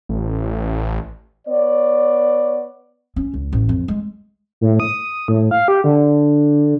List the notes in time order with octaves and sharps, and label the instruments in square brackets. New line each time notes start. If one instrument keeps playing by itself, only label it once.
[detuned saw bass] A1
[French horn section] B3 C#5 D5
[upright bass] C#4
C#2
A1
F2
G#3
[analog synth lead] A2
D#6
A2
F5
G4
D3